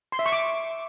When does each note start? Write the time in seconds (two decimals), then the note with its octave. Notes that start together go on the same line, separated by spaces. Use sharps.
0.12 C6
0.19 E5
0.26 C#6
0.32 D6